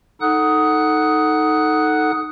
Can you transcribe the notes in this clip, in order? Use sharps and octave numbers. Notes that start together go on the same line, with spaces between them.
D#4 A4 F#5 D#6 F#6